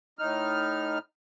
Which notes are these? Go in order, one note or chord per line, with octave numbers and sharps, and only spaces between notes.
A2 D#4 F6